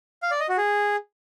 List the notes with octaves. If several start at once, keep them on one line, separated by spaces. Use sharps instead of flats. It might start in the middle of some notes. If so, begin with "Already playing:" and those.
F5
D5
D#5
F#4
G#4